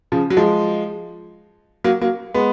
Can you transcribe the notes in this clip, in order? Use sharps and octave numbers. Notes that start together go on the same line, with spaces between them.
C#3 F3
F#3
F3 G#3
F#3 A#3
F#3 A#3
G#3 B3